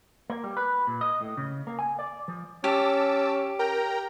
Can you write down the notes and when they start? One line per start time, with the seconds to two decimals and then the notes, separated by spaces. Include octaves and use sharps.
0.30 A#3
0.44 G3
0.57 B4
0.87 A#2
1.01 D#5
1.21 A2
1.37 C#3
1.67 A#3
1.79 G#5
1.99 D5
2.28 F3
2.64 C#4 G4 A5 D6 E6
3.59 A#4 G5 A#5